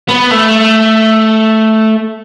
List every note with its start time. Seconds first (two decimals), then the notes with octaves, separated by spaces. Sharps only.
0.08 B3
0.31 A3